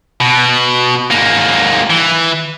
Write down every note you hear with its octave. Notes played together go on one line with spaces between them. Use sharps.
B2
G#2 A#3
E3